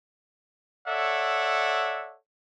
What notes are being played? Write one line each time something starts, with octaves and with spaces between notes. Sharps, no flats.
A4 C#5 D5 E5 F#5